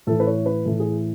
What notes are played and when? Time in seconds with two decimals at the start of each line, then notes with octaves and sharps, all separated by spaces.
0.07 A2 E3 A4
0.20 B4
0.27 C#5
0.46 B4
0.65 A2 E3 A4
0.80 G#4